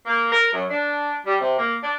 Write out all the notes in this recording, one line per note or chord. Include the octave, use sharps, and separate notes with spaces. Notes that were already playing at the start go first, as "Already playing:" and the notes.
A#3
A#4
F#2
D4
G3
C3
A#3
D4